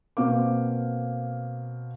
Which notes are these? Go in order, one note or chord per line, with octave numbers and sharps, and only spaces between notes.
B2 A#3 C4 F5 D6